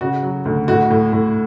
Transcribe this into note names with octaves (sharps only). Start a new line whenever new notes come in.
C#3 F#4
F#3
D2
A2 F#4
A2
A2